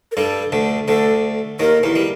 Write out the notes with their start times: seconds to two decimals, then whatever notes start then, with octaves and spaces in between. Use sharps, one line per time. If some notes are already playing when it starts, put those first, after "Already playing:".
0.12 A#4
0.16 G2 G3 A4
0.52 D2 D3
0.88 D2 D3 A4
1.60 D#2 D#3 A#4
1.83 E2 E3
1.96 G3